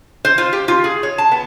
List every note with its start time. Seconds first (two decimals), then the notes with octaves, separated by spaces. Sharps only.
0.25 C5
0.38 F4
0.53 G4
0.68 F4
0.84 G#4
1.03 C#5
1.18 A5
1.31 B3